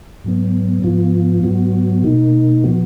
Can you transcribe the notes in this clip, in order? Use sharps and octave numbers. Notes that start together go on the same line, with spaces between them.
G#2 F#3 B3
G#2 F3 B3 F4
G#2 F#3 B3 F#4
B2 A#3 D#4
A#2 F3 B3 F#4